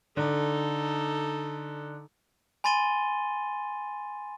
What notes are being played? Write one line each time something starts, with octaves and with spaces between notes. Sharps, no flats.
D3 D#4 A4
G#5 B5 C6 A6 D#7 G7